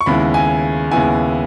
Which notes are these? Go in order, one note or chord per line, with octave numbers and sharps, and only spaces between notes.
C#6
D#2 C#3 G#3 B3 E4 B5
G#5
D#2 C#3 G#3 B3 E4 G#5